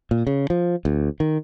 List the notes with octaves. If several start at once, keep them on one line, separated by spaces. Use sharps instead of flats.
A#2
C#3
F3
D2
D#3